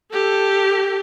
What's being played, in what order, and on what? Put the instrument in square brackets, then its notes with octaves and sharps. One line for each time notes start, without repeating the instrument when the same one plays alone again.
[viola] G4 A4